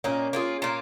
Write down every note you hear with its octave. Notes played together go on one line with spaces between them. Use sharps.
A#2 A#3 C#4 D#4
A#3 F4 G#4
A#2 A#3 F4 A#4